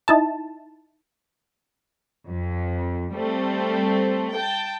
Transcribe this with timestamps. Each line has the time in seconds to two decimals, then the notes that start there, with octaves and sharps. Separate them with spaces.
0.08 D#4 E4 A5
2.27 F2
3.14 G3 A3 C4
4.33 G5 A5